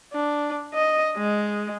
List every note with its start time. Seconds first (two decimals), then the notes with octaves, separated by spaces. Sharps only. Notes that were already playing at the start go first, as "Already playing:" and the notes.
0.13 D4
0.74 D#5
1.17 G#3